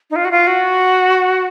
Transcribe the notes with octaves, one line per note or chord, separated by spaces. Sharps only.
D#4
F4
F#4
F4
F#4